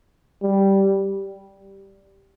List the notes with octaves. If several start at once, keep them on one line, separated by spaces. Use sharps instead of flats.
G3